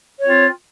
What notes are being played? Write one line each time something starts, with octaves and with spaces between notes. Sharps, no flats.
C4 F4 C#5